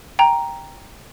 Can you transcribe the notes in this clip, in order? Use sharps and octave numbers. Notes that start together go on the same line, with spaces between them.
G5 A#5